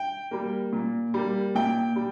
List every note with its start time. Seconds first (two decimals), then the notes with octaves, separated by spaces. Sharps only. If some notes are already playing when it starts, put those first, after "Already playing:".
Already playing: G5
0.31 G3 A#3
0.73 A#2
1.14 G3 A#3
1.55 A#2 G5
1.96 G3